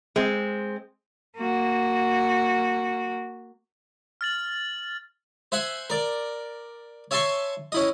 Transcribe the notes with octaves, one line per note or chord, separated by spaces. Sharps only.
G#3 C4
A#3 F#4
F6 A6 F#7
C5 E5 F#5 G#5
A#4 D5
C#5 E5 G#5 A5 C6 C#6
C#4 E4 D#5